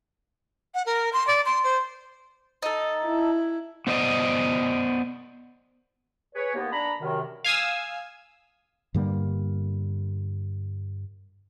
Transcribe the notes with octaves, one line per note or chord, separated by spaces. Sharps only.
F#5
A#4
C6
D5
C6
C5
D#4 A4
E4
B3 C5 D5 D#5
G#4 B4 C#5
D#2 A#3 B3
D4 A#5 B5
F#2 C3 D#3
F5 G#5 D#6 E6
G2 D3 G3 A#3